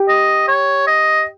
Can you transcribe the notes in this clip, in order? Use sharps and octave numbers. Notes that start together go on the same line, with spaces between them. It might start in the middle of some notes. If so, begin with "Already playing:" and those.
Already playing: G4
D#5
C#5
D#5